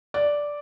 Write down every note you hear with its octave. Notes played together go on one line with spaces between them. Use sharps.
D5